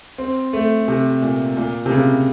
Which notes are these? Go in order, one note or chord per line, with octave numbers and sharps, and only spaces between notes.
C4
A3
C3
A#2
A#2
C3
C#3